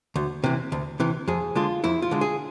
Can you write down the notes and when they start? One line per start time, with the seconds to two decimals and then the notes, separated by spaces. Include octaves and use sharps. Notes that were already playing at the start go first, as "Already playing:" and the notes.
0.16 D2
0.44 C3 E3
0.72 D2
1.00 C3 E3
1.28 F2 G#4
1.55 D3 G#3 F4
1.84 F2 E4
2.02 F4
2.11 D3 G#3
2.21 G#4